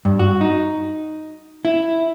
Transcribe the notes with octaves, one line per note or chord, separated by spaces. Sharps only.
G2
F#4
D#4
E4